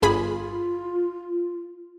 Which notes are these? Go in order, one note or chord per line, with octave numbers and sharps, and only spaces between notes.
G1 F4 G#4 B5